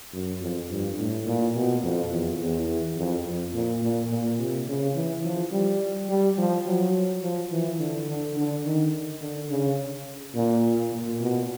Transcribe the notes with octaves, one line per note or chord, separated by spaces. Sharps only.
F#2
F2
G2
A2
A#2
B2
F2
E2
E2
F2
F2
A#2
A#2
A#2
C3
C#3
E3
F3
G3
G3
F3
F#3
F3
E3
D3
D3
D3
D#3
D3
C#3
A#2
A#2
B2